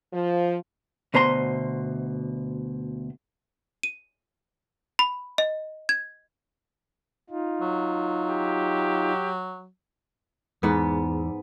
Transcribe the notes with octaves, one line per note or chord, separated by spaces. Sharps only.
F3
D2 B2 C5 A#5 C6
D#7
B5
D#5
G#6
D#4 F4
F#3
G4
E2 G#2 B3